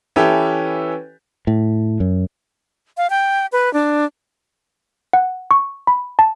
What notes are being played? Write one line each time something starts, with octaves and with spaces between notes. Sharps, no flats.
E3 C#4 E4 G4 A4 B4
A2
F#2
F5
G5
B4
D4
F#5
C#6
B5
A5